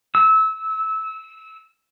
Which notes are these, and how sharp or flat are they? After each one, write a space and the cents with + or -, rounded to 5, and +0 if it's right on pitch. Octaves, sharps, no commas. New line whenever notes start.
E6 -25